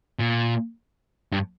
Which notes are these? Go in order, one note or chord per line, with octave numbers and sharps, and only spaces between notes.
A#2
G2